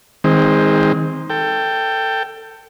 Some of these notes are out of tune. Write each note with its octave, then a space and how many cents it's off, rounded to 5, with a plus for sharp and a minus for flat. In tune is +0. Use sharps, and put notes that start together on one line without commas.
D#3 +20 G#3 -20 C4 +0
A4 +20 G5 +0